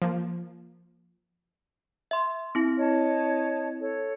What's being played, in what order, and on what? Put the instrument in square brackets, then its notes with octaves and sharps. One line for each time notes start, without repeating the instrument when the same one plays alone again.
[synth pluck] F3 A#3
[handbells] E5 C6
C4 E4
[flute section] C#5 D#5 A5
A4 C#5